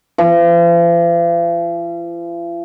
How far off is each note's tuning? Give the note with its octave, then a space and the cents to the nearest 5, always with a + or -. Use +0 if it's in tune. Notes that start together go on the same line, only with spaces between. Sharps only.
F3 -45